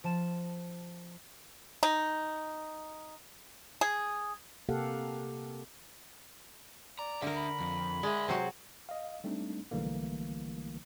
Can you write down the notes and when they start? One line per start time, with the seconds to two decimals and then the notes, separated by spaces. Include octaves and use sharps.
0.04 F3 A5 E7
1.83 D#4
3.81 G#4
4.69 C3 A#3 G4 A4 F5 F#5
6.99 D5 A#5
7.22 D3 D4 A#4 E5
7.36 B5
7.60 F2
8.03 G#3 D5 E5
8.28 C3 F#3 F#4 C5
8.89 D#5 F5
9.24 G3 A3 C4 D4 D#4
9.71 B1 D3 E3 G3 A3 A#3